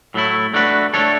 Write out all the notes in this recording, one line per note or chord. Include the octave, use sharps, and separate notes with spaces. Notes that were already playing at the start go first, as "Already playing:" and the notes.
A2 F#3 A3 E4
A3 D4 F#4 B4
A3 D4 A4 C#5